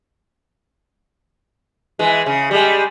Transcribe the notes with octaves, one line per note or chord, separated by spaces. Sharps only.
E3 G#3
C#3
G3 G#3